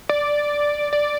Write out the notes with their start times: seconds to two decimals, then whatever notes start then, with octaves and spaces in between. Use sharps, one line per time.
0.09 D5
0.93 D5